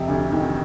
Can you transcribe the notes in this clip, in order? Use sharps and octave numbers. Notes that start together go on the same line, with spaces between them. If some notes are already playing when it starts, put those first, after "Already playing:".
Already playing: F2 C3
D2
D#3